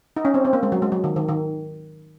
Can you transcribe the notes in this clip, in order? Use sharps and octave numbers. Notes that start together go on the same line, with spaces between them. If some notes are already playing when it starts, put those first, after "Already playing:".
D#4
C#4
C4
C4
A#3
G#3
F#3
G#3
F#3
D#3
D#3
D#3